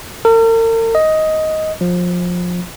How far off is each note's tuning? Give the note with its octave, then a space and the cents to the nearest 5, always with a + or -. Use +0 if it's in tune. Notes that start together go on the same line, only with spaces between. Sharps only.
A#4 -45
D#5 +10
F3 +25